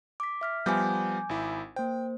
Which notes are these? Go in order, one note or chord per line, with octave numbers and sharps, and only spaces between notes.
D6 B6
E5 F6 B6
F3 G3 B3 G#5 D6 G6
G#1 E4
A#3 C5 G5